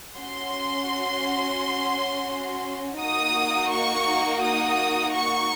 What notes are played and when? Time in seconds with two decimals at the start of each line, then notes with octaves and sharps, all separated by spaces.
0.16 C#4 F#4 C6
3.01 A#3 D#4 F#4 D#6
3.72 C#6
4.43 D#6
5.14 C#6